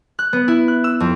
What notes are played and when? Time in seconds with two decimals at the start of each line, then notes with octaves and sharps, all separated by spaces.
0.19 F#6
0.33 B3
0.48 E4
0.68 F#6
0.84 E6
1.00 F2